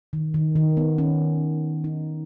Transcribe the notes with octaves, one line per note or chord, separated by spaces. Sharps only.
D#3
D#3
D#3
B3
C#4
D#4